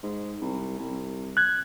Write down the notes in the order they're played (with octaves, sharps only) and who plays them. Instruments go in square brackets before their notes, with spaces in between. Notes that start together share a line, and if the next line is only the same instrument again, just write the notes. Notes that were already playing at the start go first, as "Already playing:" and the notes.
[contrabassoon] G#2
C2
C2
[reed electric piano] F#6 G#6